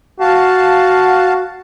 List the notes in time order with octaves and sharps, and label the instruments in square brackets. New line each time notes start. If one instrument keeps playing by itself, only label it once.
[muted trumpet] F#4 [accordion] F5 A5